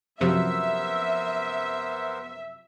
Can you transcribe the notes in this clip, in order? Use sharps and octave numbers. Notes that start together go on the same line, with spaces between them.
F#2 C3 F3 B3 A#4 C5 E5